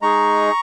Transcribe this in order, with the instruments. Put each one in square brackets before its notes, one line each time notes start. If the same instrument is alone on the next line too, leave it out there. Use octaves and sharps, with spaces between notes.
[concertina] G#3 D#4 G#4 A#5 C#6